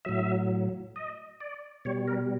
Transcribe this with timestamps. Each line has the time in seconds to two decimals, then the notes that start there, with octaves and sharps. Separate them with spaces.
0.05 A2 F#3 E5
0.96 D#5
1.41 D5
1.85 B2 G3 C#5
2.08 A#4